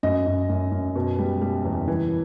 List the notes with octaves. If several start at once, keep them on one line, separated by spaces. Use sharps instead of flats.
F#2 D#5
F#2
F#2
F#2
B2
G3
G3
E2
E3